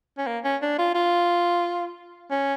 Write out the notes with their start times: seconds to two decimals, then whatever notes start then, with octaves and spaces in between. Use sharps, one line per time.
0.18 C#4
0.27 A#3
0.44 C#4
0.62 D4
0.79 F4
0.95 F4
2.31 C#4